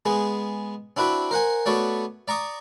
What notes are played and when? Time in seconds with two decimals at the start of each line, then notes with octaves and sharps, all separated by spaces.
0.06 G#3 B3 G#4
0.97 C4 D4 E4 F#4 B4
1.31 A#4 C5 F#5 G#5
1.66 A3 B3 F#4 C#5 D5
2.28 D5 A#5 C#6 D#6